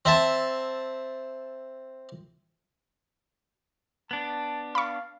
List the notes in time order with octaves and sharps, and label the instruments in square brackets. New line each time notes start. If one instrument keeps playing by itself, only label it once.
[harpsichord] C4 E5 A5
[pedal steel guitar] B3 D4 [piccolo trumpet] A5
[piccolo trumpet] F5 [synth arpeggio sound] B5 C#6